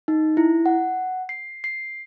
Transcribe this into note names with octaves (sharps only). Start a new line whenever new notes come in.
D#4
E4
F#5
C7
C7